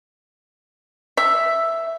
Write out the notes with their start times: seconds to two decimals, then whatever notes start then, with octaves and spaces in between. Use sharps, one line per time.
1.17 E5